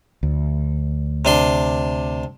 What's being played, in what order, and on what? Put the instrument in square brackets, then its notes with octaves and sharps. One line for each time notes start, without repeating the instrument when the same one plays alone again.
[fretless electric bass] D2
[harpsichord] C3 D4 C6